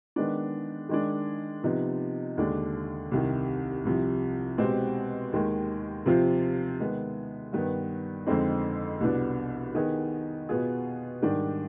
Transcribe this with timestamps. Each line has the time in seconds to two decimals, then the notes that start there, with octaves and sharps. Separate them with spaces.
0.16 D#3 G#3 B3 D4
0.89 D#3 G#3 D4
1.63 C3 F3 B3 D#4
2.37 D#2 D3 G#3 D4
3.11 C2 C3 D#3
3.85 C2 C3 F3
4.58 B2 G#3 C4 G4
5.33 D#2 D#3 G#3
6.06 C3 F3 C4 F4
6.80 D#3 G#3 B3
7.53 G2 D#3 B3
8.27 F2 D3 G#3 C4 D#4
9.00 C2 B2 B3 D4
9.75 D#3 B3 D#4 G#4
10.49 B2 B3 F4 G#4
11.22 G#2 D#3 G3 D4